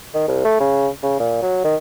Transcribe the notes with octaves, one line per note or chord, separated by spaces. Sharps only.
D#3
C2
A3
C#3
C#3
A#2
F#3
D#3